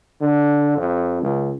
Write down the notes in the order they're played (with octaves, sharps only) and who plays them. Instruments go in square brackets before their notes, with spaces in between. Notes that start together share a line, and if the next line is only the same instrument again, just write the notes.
[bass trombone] D3
F2
C#2